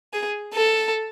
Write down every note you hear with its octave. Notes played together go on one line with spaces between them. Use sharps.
G#4
A4